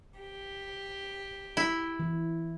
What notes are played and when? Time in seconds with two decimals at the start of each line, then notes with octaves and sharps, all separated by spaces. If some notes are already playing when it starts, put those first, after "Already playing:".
0.19 G4
1.57 E4
2.00 E3